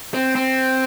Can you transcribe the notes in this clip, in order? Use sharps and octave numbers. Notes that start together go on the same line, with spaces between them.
C4
C4